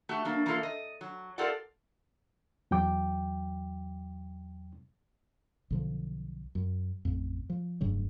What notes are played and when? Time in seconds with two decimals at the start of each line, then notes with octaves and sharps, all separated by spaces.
0.09 A3 F#4 G4
0.25 F#3 A#3 D4
0.46 E3 A#3 D4 F4 A4
0.63 D#5
1.01 F#3
1.38 F4 G4 A4 A#4 D5 F#5
2.71 E2 F#3 G5 D6
5.70 B1 D3 F3
6.55 F#2
7.05 A1 F2
7.50 F3
7.81 F1 G2 C#3 F#3